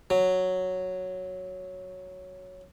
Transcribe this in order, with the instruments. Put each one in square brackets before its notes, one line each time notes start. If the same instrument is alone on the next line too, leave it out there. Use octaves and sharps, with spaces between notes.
[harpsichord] F#3